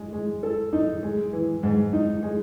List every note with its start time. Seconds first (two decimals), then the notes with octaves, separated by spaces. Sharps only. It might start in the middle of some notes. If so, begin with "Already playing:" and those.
Already playing: G#3
0.13 G#3
0.43 A4
0.73 D#4
1.03 G#3
1.33 E3
1.63 G#2
1.93 D#4
2.23 G#3